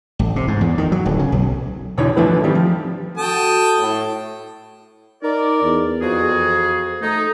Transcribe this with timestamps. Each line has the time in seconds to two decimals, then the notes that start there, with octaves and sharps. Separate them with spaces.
0.19 A1
0.36 C3
0.48 G#2
0.61 E2
0.78 D#3
0.92 F#3
1.06 D1
1.19 C#3
1.32 B1
1.97 E2 B2 D3 D#4 E4 C#5
2.17 D3 E3 F3 A3 E4 B4
2.44 D#3 E3 G3 C4
2.55 F3
3.17 F#4 A4 G5 A5 D#6
3.79 A2
5.23 D#4 A#4 D5
5.63 E2
6.02 F2 F#4 G#4
7.02 A3 D#4